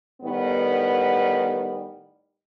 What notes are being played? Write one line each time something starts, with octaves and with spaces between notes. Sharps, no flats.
A2 D#3 G3 B3